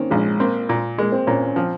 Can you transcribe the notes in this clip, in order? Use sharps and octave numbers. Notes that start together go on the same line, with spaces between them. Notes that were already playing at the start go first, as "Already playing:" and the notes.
Already playing: D#3 A#3 C4 C#4
A#1 G#3
A#3 C4
A#2
G#3 A#3
C4
A#2 C#4
C#4
F3 C4